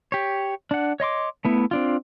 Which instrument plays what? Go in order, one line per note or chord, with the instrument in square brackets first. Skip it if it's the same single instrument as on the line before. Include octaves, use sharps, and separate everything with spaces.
[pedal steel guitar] G4 C#5
D4 F#5
C#5 D#5 C6 D6
A3 B3 E4
C4 D4 F4